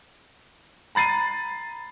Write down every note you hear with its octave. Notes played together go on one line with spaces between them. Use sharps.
A#5 B5 A6 C7 D#7